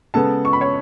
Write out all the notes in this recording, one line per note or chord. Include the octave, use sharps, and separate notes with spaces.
C#3 G#3 B3 A4 A5
C#6
B5
C#5 C#6